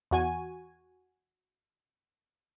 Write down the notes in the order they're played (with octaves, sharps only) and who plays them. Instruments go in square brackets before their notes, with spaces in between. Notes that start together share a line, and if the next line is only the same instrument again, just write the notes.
[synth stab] E2 F#4 G#5